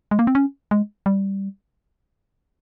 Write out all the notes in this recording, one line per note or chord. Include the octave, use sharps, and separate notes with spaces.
G#3
A#3
C4
C#4
G#3
G3